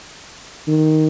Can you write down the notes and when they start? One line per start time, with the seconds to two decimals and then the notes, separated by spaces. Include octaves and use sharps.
0.68 D#3